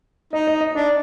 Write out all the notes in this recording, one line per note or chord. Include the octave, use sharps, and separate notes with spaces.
D#4 D#5
D#5
D#5
D4 D5